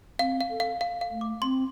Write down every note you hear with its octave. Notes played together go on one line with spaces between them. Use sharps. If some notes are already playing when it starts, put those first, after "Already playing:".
C4 F5
F5
A4
F5
F5
F5
A3
D6
C4 C6